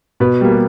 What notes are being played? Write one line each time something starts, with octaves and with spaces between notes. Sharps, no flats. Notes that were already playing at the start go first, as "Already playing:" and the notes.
B2 B4
G3 A#3
G4